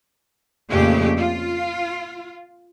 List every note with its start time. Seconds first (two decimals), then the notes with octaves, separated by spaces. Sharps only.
0.70 F2 A#2 C#3 A3 G4 G#4
1.17 F4